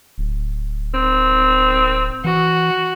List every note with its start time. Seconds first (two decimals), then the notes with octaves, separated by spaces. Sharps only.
0.18 D1
0.94 C4
2.24 E3 F#4